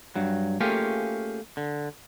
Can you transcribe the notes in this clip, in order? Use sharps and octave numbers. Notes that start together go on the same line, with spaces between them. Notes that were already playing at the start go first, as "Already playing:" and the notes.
G2 F#3
A3 A#3 C#4 F4 G4 G#4
D3